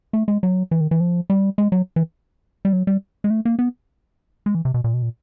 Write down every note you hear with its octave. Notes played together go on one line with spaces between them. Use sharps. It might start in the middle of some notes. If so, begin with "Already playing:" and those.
A3
G#3
F#3
E3
D#3
E3
F3
G3
G#3
F#3
E3
G3
F#3
G3
G#3
A3
A#3
B3
G#3
E3
C3
B2
A#2
B2
A#2